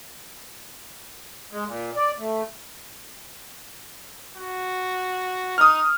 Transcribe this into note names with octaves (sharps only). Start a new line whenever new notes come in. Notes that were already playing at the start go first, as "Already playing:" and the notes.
G#3
A#2
D5
A3
F#4
D#4 D#6 F6